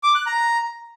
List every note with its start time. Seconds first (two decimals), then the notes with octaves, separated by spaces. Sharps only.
0.03 D6
0.15 F#6
0.26 A#5